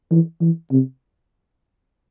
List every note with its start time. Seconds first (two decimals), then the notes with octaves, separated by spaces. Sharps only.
0.11 E3
0.41 E3
0.71 C3